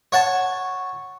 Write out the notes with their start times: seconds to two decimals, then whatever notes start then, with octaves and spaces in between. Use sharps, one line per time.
0.12 C#5 F#5 A5